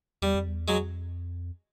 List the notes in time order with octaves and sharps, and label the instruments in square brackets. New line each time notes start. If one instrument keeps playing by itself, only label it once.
[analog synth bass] E2 [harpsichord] G3
[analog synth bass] F2
E2
[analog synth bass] F2 [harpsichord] F#3 G#3